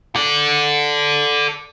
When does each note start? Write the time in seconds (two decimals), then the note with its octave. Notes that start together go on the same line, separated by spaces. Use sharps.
0.15 A4 D5